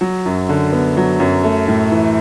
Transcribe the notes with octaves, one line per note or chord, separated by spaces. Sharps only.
F#3
F#2
D3
B3
F#3
F#2
A3
A2
E3